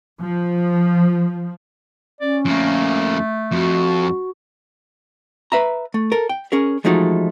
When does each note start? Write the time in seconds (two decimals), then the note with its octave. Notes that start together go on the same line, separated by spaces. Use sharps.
0.19 F3
2.21 C#4 D5
2.45 F2 A3 A#3
3.51 F2 F#4
5.52 B4 E5 A#5
5.94 A3
6.12 A4 A#4
6.29 G5
6.52 C#4 G#4 A#4
6.84 E3 F3 G#3 A3 D#4 F#4